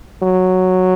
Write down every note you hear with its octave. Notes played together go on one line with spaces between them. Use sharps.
F#3